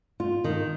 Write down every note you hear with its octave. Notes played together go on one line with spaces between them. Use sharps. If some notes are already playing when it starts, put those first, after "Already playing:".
F4
D#3